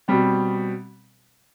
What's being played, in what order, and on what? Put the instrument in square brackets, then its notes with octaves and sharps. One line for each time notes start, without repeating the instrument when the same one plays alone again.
[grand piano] B2 G3 C4